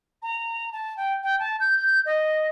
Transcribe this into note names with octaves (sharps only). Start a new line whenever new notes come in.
A#5
A5
G5
G5
A5
G6
D#5